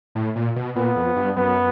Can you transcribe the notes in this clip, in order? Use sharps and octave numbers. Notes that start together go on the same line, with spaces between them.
A2
A#2
B2
A#2 B3
F2
G2
F#2 B3